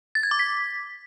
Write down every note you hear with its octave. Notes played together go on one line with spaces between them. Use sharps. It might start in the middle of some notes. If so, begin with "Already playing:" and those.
A6
G#6
D6
B6